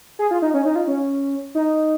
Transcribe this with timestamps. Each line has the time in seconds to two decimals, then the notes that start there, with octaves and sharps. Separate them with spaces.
0.19 G#4
0.31 F4
0.42 D#4
0.54 C#4
0.65 D#4
0.76 F4
0.88 C#4
1.55 D#4